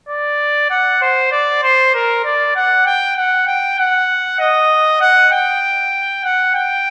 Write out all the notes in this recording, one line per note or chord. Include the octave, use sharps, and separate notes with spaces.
D5
F#5
C5
D5
C5
A#4
D5
F#5
G5
F#5
G5
F#5
D#5
F#5
G5
F#5
G5